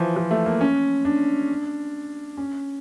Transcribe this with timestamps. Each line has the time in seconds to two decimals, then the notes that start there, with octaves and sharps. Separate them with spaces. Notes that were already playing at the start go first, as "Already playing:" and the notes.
Already playing: E3 F3
0.16 F3
0.31 A3
0.46 A#3
0.61 C#4
1.05 D4
2.37 C#4